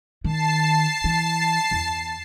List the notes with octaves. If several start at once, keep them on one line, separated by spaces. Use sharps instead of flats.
D#3 A5 C7
E3
E2